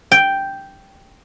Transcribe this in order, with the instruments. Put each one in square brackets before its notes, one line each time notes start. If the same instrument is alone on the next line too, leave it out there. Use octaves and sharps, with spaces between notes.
[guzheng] G5